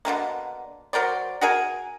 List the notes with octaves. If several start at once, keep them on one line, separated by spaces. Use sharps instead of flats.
B2 D3 D#3 A#3
F#3 A#4 C5 D5
F#4 G#4 A#4 G#5